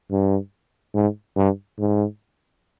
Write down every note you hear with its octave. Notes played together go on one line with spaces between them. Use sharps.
G2
G#2
G2
G#2